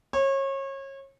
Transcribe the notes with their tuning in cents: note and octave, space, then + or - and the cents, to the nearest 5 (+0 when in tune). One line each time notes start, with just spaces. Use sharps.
C#5 -30